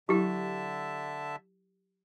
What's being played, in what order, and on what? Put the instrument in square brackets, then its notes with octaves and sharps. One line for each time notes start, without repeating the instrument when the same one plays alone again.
[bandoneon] D3 E5 A5 [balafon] F#3 E4 [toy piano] G4